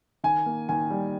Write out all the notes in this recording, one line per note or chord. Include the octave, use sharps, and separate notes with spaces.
D#3 G#5
A#3
D#3 G#5
G3